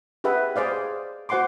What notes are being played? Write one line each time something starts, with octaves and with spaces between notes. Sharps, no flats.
G4 G#4 B4 E5 F#5
G#4 C5 D5 F5
F#4 C5 F#5 G#5 C6 D6